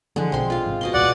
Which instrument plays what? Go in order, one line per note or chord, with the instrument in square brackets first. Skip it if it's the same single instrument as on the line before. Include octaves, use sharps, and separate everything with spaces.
[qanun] D3 G#3 [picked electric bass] E3 F3 A3
[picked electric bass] B1 B2 F3 [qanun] C4 C6
[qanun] F4 F5
[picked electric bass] G#1 C3
[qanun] B2 D#5 C6
[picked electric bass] D#1 C2 A#2 [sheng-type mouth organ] D5 F#5